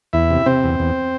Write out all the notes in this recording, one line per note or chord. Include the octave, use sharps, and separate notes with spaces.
E2 E4 E5
C3
C3 C4 C5
E2
E2